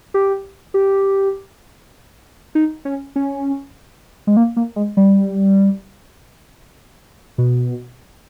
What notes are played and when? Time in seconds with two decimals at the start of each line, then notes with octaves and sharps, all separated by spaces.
0.14 G4
0.74 G4
2.55 D#4
2.85 C#4
3.16 C#4
4.27 G#3
4.37 A#3
4.57 A#3
4.76 G#3
4.97 G3
7.38 B2